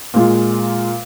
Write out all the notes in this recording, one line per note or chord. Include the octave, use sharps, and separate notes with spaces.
A#2 G#3 F4